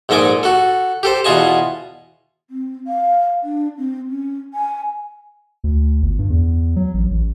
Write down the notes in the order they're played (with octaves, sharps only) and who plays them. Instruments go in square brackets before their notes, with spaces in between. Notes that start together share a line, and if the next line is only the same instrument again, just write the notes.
[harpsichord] A#1 G#2 A4 D#5 G#5 D6
F#4 A4
G4 A4 C5
E2 B2 F4 D#5 G#5 A5
[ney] C4
F5
D4
C4
C#4
G#5
[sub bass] D2
G1
G2
E2
F#3
A1
A1